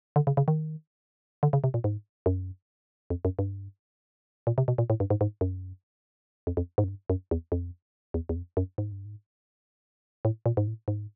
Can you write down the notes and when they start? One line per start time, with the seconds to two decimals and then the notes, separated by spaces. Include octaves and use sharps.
0.16 D3
0.27 C#3
0.37 C#3
0.48 D#3
1.43 D3
1.53 C#3
1.64 C3
1.74 A#2
1.84 G#2
2.26 F#2
3.10 F2
3.25 F#2
3.39 G2
4.47 A#2
4.58 C3
4.68 B2
4.78 A#2
4.90 A2
5.00 G2
5.10 G#2
5.21 G#2
5.41 F#2
6.47 F2
6.57 F2
6.78 G#2
6.84 F#2
6.88 G2
7.10 F#2
7.31 E2
7.52 F2
8.14 E2
8.29 E2
8.36 F2
8.57 F#2
8.78 G#2
8.92 G2
9.05 G#2
10.25 A2
10.46 A#2
10.57 G#2
10.67 A2
10.88 G#2